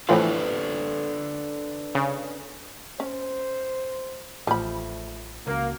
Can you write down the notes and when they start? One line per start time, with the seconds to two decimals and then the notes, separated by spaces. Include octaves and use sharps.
0.09 A2 E3 F3 D4 A4 B4
1.95 C#3
3.00 C#4 C5
4.47 A1 F3 A3 B5
5.47 C#2 A#3 F#4